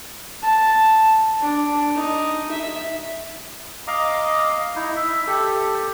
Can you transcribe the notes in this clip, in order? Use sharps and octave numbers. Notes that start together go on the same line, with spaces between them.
A5
D4
D#4
E5
D#5 F5 A#5 D6
D#4 E4
E5
G4 A4